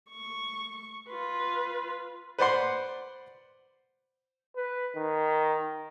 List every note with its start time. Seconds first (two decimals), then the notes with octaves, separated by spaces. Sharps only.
0.11 C#6
1.10 F4 B4
2.39 B4 C5 D5 F#5 C6
4.56 B4
4.96 D#3